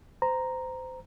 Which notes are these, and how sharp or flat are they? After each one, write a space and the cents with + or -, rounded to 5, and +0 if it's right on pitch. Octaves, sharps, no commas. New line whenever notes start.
C5 -25 A#5 +0